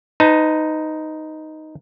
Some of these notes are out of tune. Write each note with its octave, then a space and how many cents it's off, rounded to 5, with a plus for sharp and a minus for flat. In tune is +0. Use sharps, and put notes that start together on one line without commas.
D#4 +0 B4 +35 A5 +25